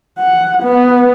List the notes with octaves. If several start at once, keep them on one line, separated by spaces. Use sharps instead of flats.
F#5
B3